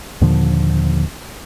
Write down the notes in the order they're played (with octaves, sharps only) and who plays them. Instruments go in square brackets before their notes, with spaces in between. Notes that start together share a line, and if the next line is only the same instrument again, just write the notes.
[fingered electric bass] D#2 A#2 D3 F3